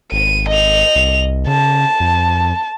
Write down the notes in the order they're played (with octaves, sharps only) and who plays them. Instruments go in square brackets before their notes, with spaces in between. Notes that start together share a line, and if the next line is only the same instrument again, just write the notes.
[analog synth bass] G#1 [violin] D#7
[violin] D#5 F7
[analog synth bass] C2
[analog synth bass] C#3 [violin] A5
[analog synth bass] F2